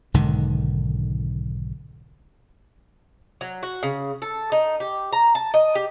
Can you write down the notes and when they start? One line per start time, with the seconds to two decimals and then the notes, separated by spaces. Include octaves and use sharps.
0.14 B1 G#2 D3 D#3
3.41 F#3
3.63 F#4
3.83 C#3
4.22 A4
4.52 D#4
4.80 G4
5.13 A#5
5.35 A5
5.54 D#5
5.75 G4